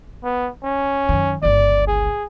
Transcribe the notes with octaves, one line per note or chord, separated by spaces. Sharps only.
B3
C#4
F#2 D#3
G1 C#2 D5
G#4